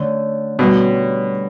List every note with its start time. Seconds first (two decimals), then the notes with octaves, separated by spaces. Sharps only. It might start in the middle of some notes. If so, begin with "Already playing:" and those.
Already playing: D3 A3 C#4
0.59 B2 D3 G3 C#4